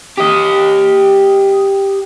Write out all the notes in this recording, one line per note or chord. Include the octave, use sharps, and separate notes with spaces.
G4 D#5